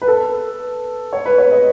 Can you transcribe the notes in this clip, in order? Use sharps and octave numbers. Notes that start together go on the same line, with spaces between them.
B4
A4
C#5
B4
C#5
D#5